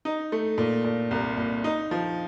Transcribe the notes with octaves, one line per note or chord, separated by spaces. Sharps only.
D#4
A3
A#2
A#2
C2
A#2
D#4
F3